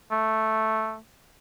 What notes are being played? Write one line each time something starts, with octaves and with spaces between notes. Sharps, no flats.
A3